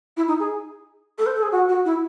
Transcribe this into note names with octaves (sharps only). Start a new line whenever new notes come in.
E4
D#4
G#4
A4
C5
A4
G#4
F#4
F#4
E4